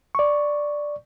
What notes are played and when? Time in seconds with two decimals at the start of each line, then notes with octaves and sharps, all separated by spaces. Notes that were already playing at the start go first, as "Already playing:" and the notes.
0.15 D5 C#6